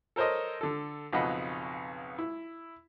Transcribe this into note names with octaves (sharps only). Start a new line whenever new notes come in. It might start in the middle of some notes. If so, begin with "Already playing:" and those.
A4 A#4 C5 C#5 D#5
D3 A4
B1 F2 C#3 D#5 F#5 B5
E4